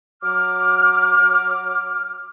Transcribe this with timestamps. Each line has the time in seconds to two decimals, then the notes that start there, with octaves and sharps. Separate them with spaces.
0.23 F#3 D6 F6